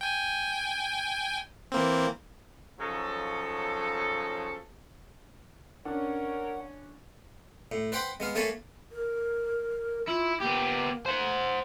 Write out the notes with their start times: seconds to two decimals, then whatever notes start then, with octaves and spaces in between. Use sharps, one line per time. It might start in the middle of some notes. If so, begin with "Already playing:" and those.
0.01 G5 G#5
1.72 E3 A#3 C4
2.80 C#3 F3 F#3 D#4 A4
5.85 C#4 D4 A#4 F#5
7.72 A2
7.92 B4 C5 F#5 G5 B5 C6
8.20 G#3 B3 F5
8.35 A3 A#3 C#5 G#5 A5 B5
8.92 A#4
10.07 E4 F4
10.40 A#3 B3 G4
11.06 C5 F#5